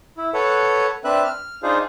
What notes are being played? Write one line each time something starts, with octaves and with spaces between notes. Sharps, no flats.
E4
A4 B4 C#5 F#5
C4 D4 B4 E5 F#6
F6
D4 D#4 F4 G#4 C5